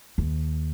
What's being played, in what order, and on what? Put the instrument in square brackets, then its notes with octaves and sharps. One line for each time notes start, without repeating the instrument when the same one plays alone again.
[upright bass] D#2